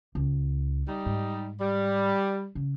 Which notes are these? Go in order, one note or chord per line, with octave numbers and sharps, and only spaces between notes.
C#2
G3 D#4
G#2
G3
C#3